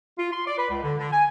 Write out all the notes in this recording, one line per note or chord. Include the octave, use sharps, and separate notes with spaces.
F4
C6
D5
B4
C#2
D3
D3
G#5